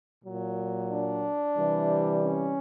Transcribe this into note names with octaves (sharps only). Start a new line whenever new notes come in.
A#2 F#3
D4
C3 E3 G3
C#4